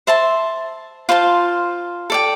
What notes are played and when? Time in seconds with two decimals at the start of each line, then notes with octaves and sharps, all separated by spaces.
0.07 C5 E5 A5 C6
1.09 F4 C5 F5 A5
2.10 A4 D5 G5